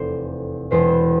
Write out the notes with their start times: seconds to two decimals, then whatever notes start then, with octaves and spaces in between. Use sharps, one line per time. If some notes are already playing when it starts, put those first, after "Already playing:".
Already playing: F1 E2 C3 E3 A4 C5 D5
0.71 E1 E2 B2 C5